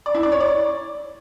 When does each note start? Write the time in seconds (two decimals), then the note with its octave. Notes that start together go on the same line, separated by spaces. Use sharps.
0.06 D5
0.15 E4
0.23 D5
0.32 C#5
0.40 D5